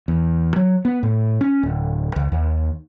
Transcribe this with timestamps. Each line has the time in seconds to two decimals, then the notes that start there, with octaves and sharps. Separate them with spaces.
0.08 E2
0.56 F#3
0.85 B3
1.03 A2
1.41 C#4
1.63 D1
2.16 C#2
2.32 D#2